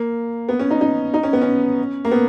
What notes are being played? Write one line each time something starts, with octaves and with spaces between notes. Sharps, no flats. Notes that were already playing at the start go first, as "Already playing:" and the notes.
Already playing: A#3
B3
C#4
D#4
D#4
D#4
C#4
B3
C#4
A#3
B3